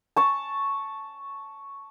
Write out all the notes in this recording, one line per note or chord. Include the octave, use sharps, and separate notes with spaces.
A5 C#6